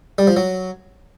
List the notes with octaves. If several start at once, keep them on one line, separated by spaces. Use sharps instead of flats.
G3
F3
F#3